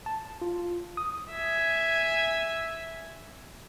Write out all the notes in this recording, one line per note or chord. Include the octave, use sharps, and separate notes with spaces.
A5
F4
D#6
E5 G#5